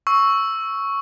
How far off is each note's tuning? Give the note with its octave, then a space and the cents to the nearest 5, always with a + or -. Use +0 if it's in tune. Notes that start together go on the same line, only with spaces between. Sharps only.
C#6 +0 E6 +0